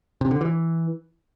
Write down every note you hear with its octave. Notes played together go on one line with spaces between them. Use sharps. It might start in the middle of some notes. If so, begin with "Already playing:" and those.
C3
D3
E3